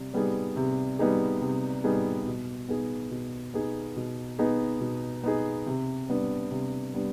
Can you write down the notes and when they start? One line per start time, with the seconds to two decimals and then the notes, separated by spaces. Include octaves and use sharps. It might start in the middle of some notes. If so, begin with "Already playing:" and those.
Already playing: C3 G3
0.14 G3 B3 D#4 G#4
0.56 C3
0.99 G3 B3 D#4 G#4
1.41 C3
1.84 G3 B3 D#4 G#4
2.27 B2
2.68 B3 D#4 G#4
3.11 B2
3.54 B3 D#4 G#4
3.96 B2
4.39 B3 D#4 G#4
4.81 B2
5.23 B3 D#4 G#4
5.66 C3
6.09 G3 B3 D4
6.51 C3
6.94 G3 B3 D4